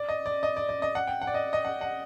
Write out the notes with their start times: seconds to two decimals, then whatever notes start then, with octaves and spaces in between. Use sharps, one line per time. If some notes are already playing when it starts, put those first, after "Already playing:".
Already playing: D5
0.09 D#5
0.26 D5
0.43 D#5
0.57 D5
0.69 D5
0.82 D#5
0.95 F#5
1.07 G5
1.22 F#5
1.27 D5
1.34 D#5
1.53 D#5
1.65 F#5
1.81 F#5